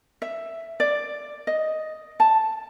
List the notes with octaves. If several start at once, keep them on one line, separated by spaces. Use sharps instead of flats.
E5
D5
D#5
A5